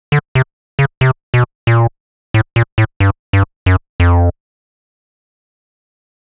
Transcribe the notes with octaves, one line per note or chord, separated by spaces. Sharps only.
D3
C3
C#3
C3
B2
A#2
A2
A#2
A2
G2
G2
F#2
F2